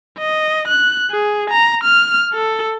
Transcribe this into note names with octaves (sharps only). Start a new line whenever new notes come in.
D#5
F#6
G#4
A#5
F6
A4